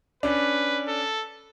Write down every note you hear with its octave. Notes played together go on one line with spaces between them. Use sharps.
C#4 D4 B4
A4